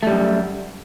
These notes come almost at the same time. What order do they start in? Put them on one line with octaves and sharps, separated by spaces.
A3 G3 F#2